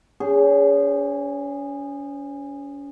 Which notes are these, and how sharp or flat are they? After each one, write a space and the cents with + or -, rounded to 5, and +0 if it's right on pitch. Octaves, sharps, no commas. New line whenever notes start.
C#4 +40 G#4 -20 C5 +0